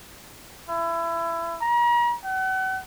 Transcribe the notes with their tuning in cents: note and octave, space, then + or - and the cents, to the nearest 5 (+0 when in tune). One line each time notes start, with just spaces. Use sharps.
E4 +25
A#5 +40
F#5 +40